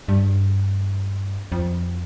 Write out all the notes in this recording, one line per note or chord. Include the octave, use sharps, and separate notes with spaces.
G2
F2